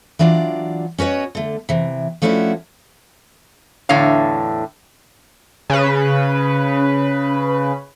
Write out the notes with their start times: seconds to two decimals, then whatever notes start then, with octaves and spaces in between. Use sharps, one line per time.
0.19 E3 F#3 D4 F4 D5
0.98 C#4 F#4 B4 C#5 D#5
1.35 D3 A3
1.69 C3 E3
2.22 F3 A3 C#4 D4 E4 F#4
3.89 E2 A2 D3 C#5 F5
5.70 C#3 B4